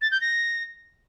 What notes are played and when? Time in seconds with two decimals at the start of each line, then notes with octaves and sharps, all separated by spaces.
0.02 A6
0.11 G6
0.21 A#6